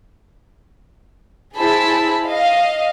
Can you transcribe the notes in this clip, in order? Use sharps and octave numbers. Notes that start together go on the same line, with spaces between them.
E4 G#4 C5 A5 B5
D#5 F5